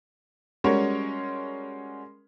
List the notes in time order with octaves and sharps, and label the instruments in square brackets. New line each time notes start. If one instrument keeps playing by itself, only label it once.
[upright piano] G3 G#3 C#4 F#4 A#4 C#5